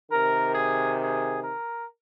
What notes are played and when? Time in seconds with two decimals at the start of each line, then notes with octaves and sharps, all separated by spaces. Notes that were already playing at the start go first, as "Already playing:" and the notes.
0.11 C3 D#3 A#4
0.55 G#4
1.00 G#4
1.44 A#4